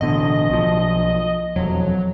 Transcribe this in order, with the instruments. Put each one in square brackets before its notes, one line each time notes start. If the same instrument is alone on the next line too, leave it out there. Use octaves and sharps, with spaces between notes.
[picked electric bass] A1 B2 D3 [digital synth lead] D#5
[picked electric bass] B1 F3
[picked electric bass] E1 F2 [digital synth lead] F#3